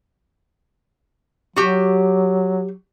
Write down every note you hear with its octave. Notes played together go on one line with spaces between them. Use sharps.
F#3 F#4 G4